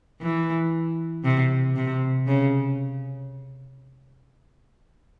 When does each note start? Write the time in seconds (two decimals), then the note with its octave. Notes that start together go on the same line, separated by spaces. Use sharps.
0.21 E3
1.24 C3
1.76 C3
2.27 C#3